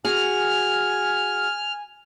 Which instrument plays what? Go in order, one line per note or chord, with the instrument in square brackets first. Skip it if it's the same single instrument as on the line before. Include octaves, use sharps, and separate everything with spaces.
[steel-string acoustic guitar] F#4 G#4 [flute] G#5 [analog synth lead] F6